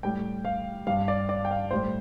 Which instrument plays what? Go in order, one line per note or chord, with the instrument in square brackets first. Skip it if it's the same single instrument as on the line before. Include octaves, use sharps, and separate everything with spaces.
[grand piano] A2 G3 G5
F5
G2 G3 F5
D5
D5
G5
F5
A2 G3 C5